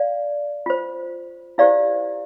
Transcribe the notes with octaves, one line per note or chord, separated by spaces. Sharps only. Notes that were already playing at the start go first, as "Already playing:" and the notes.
Already playing: D5 F5
F4 C5
E4 G4 C5 D5 F5